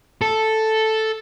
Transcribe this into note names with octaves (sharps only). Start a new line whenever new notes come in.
A4